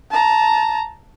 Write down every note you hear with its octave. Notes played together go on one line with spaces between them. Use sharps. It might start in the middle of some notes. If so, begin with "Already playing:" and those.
A5 A#5